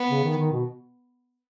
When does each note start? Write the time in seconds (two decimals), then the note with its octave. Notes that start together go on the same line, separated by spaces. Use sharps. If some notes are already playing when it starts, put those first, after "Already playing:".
Already playing: B3
0.09 C#3
0.24 D#3
0.38 D#3
0.53 B2